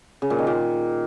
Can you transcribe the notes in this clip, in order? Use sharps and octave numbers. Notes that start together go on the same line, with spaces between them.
C#3
A#2
D#3
A#2